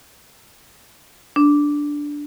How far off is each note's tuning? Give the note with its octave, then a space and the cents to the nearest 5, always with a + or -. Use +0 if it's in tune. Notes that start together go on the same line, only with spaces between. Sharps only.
D4 -5